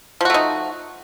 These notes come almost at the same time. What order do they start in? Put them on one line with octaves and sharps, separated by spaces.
F3 F#4 A3 D#4